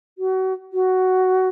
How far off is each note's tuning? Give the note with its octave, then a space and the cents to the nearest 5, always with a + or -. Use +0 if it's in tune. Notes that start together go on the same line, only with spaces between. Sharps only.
F#4 +30
F#4 +10